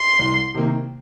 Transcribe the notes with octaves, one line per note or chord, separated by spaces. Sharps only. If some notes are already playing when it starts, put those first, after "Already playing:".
Already playing: C6
C2
C3 D#3 A#3